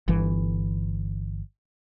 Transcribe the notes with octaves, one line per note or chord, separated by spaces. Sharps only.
G1 E3